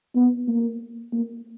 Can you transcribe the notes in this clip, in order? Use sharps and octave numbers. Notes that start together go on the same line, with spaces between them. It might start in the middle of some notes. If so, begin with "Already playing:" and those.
B3
A#3
A#3